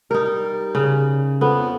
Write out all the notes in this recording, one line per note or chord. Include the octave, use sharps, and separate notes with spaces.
G3 D#4 A#4
C#3
F2 B3